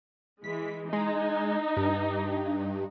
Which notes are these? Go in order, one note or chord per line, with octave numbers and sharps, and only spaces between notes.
E3 G#3 B6
G#3 D#4
G2